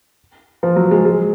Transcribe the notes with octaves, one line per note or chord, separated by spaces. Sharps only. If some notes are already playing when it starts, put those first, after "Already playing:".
F3
F#3
G#3
G#3